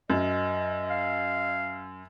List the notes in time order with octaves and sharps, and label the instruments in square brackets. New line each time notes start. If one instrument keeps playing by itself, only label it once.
[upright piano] F#2 [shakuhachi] D#5
[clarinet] F5